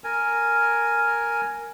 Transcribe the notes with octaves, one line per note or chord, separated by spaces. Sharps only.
A#4 G#5